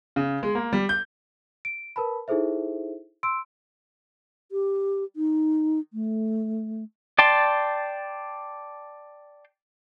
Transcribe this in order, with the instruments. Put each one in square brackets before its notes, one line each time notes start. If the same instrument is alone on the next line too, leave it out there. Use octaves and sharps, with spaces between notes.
[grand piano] C#3
G#3
A#3
G3
G6
[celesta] D7
A#4 B4 A5 B5
D#4 E4 G#4 A4 C5 E5
C6 E6 D7
[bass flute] G4
D#4
A3
[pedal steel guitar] D5 G5 A5 C6